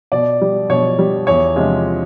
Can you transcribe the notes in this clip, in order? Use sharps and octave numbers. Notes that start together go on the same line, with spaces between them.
B2 D5
G3
B2 C#5
G3
E2 C#5
C3 F3 G#3